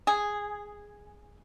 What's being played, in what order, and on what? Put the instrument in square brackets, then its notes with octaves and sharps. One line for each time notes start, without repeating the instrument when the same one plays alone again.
[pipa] G#4